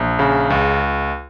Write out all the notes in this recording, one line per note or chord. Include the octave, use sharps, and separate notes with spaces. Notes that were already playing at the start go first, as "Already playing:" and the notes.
Already playing: A#1
C#3
C#2